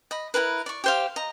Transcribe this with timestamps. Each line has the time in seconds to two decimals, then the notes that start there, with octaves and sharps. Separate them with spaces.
0.11 D#5 B5
0.34 E4 F#4 A#4 B4
0.66 D5 C#6
0.84 G4 C5 F5
1.16 D#5 A#5